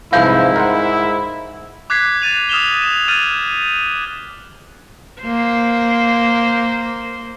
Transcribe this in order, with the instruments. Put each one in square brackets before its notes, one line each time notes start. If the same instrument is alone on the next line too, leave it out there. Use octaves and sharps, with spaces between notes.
[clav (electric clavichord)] C2 E3 F3 [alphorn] G#2 [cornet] E4 [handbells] F5 G6
[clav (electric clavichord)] A#4 C5 F#5
[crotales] D6 F#6 G#6 B6 C7
F#6 A6 D#7 F7
D#6 F6 E7 F7 G7
D#6 D#7 E7
F6 G6 A6 D#7 F#7
[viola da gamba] A#3 C5